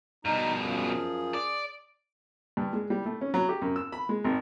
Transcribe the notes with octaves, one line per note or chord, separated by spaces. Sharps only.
G2 B2 D#4
F#2 F3 G#4
D5
G2
G#3
G3
A3
C#4
F#3
G4
F#2
E6
B5
G#3
G#1